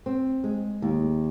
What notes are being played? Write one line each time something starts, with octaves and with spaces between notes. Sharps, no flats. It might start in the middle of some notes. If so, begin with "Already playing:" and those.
C4
G#3
D#2